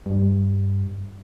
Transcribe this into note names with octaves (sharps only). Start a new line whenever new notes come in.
G2